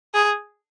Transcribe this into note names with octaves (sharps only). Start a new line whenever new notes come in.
G#4